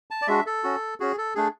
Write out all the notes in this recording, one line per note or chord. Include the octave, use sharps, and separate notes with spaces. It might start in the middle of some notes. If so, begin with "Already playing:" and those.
A5
D5
G#3 D4 F#4 E5
A4
C#4 F#4
C#4 F#4 G#4
A4
A3 D4 G#4